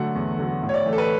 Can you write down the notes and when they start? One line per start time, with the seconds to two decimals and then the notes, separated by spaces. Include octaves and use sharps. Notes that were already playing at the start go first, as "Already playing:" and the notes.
Already playing: D3 F#3 A3 F#5
0.15 E2
0.39 D3 F#3 A3
0.63 A2
0.69 C#5
0.74 D5
0.86 E3 A3
0.93 A4
0.98 B4